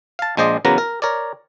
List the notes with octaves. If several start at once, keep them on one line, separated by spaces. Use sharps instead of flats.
F5 A5
A#1 G#3 C5 D5 D#5
E2 C#3 F#3 A#4 B4 A#5
A#4
A#4 C#5 D5